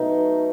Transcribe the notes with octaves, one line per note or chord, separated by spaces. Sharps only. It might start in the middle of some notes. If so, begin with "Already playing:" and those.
Already playing: B2 F#3 A3 D#4